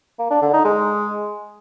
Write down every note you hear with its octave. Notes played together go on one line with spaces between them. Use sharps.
A#3
D4
D3
D#4
G#3